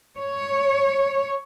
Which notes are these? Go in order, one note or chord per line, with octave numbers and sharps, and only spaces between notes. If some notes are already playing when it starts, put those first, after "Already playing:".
C#5